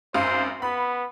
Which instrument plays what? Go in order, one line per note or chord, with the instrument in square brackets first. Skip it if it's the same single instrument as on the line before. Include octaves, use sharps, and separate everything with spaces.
[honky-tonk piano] G#1 F#2 F5 [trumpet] C5
[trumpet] B3 [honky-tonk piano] B5